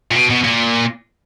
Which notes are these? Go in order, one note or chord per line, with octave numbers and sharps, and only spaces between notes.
A#2
B2
B2
A#2